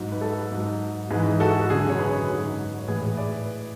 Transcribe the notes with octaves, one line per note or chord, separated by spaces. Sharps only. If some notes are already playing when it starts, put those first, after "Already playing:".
Already playing: G#2 F#3
B4
F#4 A4
G#2 F#3
G#2 G#4 B4
E3
F#4 A4
F#4
F#2 D3 F#3 G#4
C#5
G#4 B4
G#2 F#3
C#5
A2 E3 G#4 B4
B4 D5